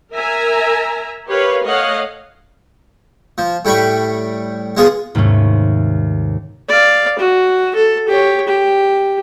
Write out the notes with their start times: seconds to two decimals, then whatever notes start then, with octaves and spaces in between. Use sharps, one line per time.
0.13 A#4 E5 G#5 A#5
1.28 G4 A#4 B4 C#5 F5
1.66 A3 C#5 D#5 F5 F#5
3.38 F3
3.65 A2 G3 G5 B5 C#6
4.77 G#3 B3 F4 G#4
5.15 D#2 G#2 C3 A3 C#4
6.69 D5 F5
7.19 F#4
7.75 A4
8.08 G4 C#5
8.48 G4